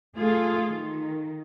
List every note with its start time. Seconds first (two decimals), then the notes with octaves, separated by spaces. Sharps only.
0.15 A3 F4 G#4 A4
0.69 D#3